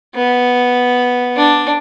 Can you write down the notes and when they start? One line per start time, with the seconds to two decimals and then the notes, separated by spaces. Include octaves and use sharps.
0.15 B3
1.36 D4